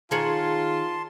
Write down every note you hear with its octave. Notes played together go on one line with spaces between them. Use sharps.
D#3 F4 G#4 C#5 A5 C6